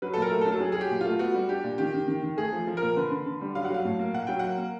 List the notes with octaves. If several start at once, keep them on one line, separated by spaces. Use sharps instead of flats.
F#3 B4
A4
A#2
A#4
A3
A4
F#3
A4
F#3 G#4
G#4
F#3
G4
A#2
A3 F4
B3 F#4
G3
D4 G4
A#2
D#3 G4
D#3
D#3
D#3
A3 G#4
F3
F3
A#4
A#2
D3 B4
D3
D3
G3
F#3 F5
F#5
F#3 F5
A2
A#3
A#2 F#5
F#3 G5
A#3 F#5
A#3